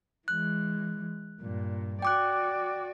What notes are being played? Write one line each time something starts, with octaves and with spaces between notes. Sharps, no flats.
E3 G#3 F#6
G2 A#2
F#4 D5 G5 D6 F#6